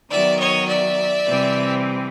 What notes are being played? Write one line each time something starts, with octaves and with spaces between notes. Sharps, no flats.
D#3 F#3 B3 D5 E5
C#5 D#5
D5 E5
C3 E3 G3 C4